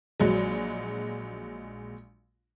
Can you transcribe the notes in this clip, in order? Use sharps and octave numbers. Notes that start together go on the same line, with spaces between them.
A#1 F#3 G#3